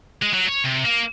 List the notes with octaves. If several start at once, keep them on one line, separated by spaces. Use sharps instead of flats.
G#3
F#3
C#5
C3
A#3